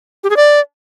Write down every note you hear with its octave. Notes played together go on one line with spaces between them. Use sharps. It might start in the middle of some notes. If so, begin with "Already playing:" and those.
G4
G#4
D5